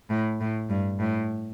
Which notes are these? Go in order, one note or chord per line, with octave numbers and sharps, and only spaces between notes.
A2
A2
G2
A2